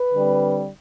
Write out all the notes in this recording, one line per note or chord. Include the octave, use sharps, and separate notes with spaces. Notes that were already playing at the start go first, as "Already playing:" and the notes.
Already playing: B4
D3 G3 C4